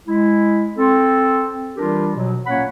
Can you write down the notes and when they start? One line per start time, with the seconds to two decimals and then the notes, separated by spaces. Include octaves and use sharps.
0.07 G#3 E4
0.77 C4 A4
1.76 E3 G3 D4 F4 G4 A#4
2.16 B2 F3 F#3
2.47 A#2 A#3 C#4 C#5 F#5 B5